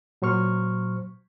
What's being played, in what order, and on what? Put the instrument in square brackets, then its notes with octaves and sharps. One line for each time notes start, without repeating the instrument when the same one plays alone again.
[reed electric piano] A#2 F#3 C5 C#6 F6